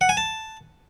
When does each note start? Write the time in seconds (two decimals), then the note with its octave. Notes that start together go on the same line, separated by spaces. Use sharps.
0.01 F#5
0.09 G#5
0.17 A5